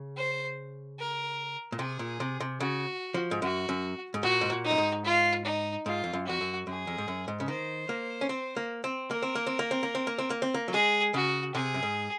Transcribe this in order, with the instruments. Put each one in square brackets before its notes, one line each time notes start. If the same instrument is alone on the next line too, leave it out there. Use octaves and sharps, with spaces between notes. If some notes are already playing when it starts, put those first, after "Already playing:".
Already playing: [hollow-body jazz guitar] C#3
[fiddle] C5
A#4
[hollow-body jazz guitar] A#2
[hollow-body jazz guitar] C3 [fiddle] G#4
[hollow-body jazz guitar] A#2
C3
C3
[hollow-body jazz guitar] C#3 [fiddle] F#4
[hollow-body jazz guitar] F3
G#2
[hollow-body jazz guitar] F#2 [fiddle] F#4
[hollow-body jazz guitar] F#2
G#2
[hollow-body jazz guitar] A#2 [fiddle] F#4
[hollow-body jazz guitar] G#2
A#2
[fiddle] D#4
[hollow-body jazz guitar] F#2
G#2
[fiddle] F4
D#4
[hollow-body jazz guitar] G#2 [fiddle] F4
[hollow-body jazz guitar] F2
F#2
[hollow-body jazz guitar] F2 [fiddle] F#4
[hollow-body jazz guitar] F#2
[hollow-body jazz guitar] F#2 [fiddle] G#4
[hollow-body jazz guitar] F2
G#2
F#2
G#2
C#3
[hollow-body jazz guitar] D#3 [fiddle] C5
[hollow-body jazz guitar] A#3
C#4
C4
A#3
C4
[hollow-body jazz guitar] A#3 [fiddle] A#4
[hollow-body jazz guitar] C4
A#3
C4
A#3
C4
A#3
C4
A#3
C4
A#3
C4
A#3
F#3
[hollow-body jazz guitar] G#3 [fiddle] G#4
[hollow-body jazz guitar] C#3 [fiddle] F#4
[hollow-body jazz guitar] C3 [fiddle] G#4
[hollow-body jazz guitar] F#2
G#2